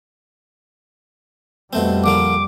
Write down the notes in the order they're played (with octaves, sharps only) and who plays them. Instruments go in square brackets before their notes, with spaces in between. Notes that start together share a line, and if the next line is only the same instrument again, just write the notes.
[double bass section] F2 G3 [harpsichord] B2 A3 C4
[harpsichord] A#1 D3 A#3 [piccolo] D6